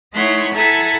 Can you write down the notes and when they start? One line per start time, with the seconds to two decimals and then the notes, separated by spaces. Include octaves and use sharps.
0.13 A3 D#4 E4 C#5 F#5 C6
0.53 E4 A4 E5 F#5 G#5 A#5